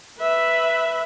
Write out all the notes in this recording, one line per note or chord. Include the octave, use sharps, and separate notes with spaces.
B4 E5